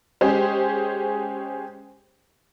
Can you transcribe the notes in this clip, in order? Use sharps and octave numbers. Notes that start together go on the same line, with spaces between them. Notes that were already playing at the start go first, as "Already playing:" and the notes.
G#3 C#4 G4 G#4 C5